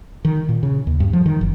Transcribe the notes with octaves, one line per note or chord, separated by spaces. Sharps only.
D#3
A#2
C#3
D#2
G2
F3
D#3
F#1